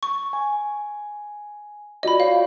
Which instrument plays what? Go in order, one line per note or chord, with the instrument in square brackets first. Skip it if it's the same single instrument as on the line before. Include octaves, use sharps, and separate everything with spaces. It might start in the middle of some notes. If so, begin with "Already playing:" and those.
[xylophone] C#6
[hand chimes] G#5
[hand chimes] F4 F#4 D5 [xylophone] D#5 B5
[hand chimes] C#5 [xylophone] F5